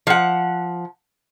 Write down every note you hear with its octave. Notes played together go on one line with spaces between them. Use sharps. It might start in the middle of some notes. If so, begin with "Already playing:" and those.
F3 F#5